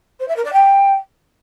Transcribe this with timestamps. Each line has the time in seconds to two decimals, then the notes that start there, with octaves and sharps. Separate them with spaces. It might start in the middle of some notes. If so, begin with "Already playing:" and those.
0.20 C5
0.28 E5
0.36 A#4
0.45 D5
0.53 G5